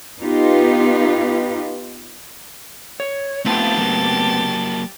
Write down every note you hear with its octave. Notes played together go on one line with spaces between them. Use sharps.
B3 D#4 F4 G4 B4
C#5
A3 B3 C4 E4 F4 G4 A5 A6
F#3 A#3